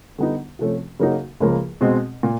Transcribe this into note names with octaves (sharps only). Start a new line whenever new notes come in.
D3 G3 B3 D#4
C3 F3 A3 C#4
C#3 F#3 A#3 D#4 F#4
C#2 C#3 F3 A#3
B2 G#3 C4
A#2